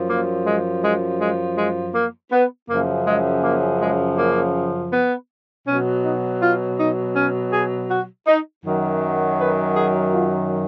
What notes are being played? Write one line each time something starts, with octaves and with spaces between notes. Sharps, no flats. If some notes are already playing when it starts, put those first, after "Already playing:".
Already playing: F#2 F3
A#3
G#3
G#3
G#3
G#3
A#3
B3
F#2 C#3 F3 A#3
G#3
A#3
G#3
A#3
B3
B2 F#3 C#4
D#4
F4
D#4
C#4
G#4
F#4
D#4
F#2 D#3 F#3
B4
G#4
F4